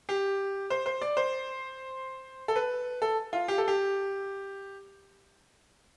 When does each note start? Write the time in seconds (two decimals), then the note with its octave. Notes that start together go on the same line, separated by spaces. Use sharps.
0.09 G4
0.70 C5
0.86 C5
1.02 D5
1.17 C5
2.48 A4
2.56 B4
3.02 A4
3.33 F4
3.48 G4
3.58 A4
3.68 G4